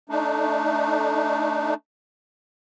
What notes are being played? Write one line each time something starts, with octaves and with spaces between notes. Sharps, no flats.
A3 D4 D#4